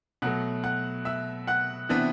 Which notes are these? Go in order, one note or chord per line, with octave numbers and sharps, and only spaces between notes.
B2 F#3 A3 F#5 F#6
F#5 F#6
E5 E6
F#5 F#6
C3 E3 B3 D4